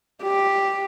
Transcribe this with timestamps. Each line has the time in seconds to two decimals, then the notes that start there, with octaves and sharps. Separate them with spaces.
0.23 G4